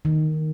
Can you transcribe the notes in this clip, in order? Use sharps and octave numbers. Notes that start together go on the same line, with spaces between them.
D#3